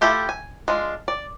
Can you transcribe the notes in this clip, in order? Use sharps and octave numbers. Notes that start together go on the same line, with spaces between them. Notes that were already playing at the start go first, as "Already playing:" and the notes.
A3 E4 F4 G4 A4
G#5
G#3 D4 F4
D5